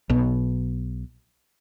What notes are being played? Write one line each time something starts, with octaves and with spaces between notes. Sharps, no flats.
B1 B2